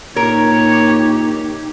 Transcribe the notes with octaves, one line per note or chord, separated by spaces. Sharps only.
A#2 D#4 G4 A#4 C#5